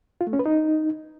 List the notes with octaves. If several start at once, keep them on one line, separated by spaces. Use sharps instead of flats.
F4
A3
C#4
B4
D#4